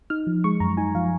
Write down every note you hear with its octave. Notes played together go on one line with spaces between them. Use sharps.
D#4 F6
F3
G#3 C#6
F#2 A#5
D#4 G#5
F3 F5